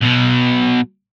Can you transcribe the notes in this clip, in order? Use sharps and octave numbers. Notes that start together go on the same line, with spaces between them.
B1 B2